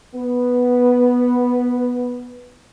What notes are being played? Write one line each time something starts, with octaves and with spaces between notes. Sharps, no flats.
B3 B4